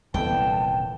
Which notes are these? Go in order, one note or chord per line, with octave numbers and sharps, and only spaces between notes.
D#1 C2 D3 E3 B3 A4 G5 A5